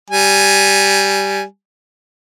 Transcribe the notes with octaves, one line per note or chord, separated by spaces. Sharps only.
G3 G#5